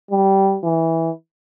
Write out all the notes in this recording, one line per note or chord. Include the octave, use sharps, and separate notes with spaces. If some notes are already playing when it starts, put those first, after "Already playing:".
G3
E3